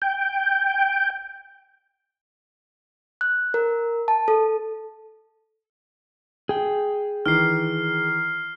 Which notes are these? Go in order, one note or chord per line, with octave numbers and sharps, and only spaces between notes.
G5
F#6
A#4
A5
A4
G#4 G5
D#3 E3 F6 C7